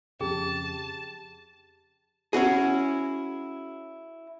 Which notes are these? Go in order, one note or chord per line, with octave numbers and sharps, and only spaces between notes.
F2 C#3 G4 G#4 A5
C#4 E4 F#4 G#4